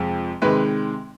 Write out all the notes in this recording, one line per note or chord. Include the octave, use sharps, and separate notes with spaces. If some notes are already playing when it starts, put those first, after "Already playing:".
Already playing: F2 C3 F3 G#3
C3 D#3 G#3 B4